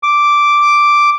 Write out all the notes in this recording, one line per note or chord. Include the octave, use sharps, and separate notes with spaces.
D6